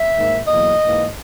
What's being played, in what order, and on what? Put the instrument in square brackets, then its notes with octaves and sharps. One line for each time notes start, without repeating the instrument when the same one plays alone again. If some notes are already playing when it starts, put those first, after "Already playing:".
Already playing: [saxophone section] E5
G#2 D#3 A#3
E2 B2 F#3 A#3 D#5
G#2 E3 A#3